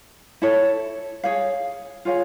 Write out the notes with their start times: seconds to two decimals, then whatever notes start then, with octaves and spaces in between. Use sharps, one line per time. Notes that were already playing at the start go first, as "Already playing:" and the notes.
0.42 E4 A4 C#5
1.24 G#4 C#5 F5
2.05 F4 G#4 C#5 F5